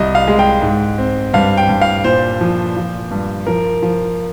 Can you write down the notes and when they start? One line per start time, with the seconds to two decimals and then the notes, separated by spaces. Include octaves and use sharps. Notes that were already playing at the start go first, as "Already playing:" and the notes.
Already playing: C2 D#5
0.15 F5
0.28 G#3
0.39 G5
0.62 G#2
0.98 C4
1.34 G2 F5
1.57 G5
1.69 G2
1.82 F5
2.04 A#2 C5
2.41 F3
2.77 F3
3.11 G2
3.47 F3 A#4
3.83 F3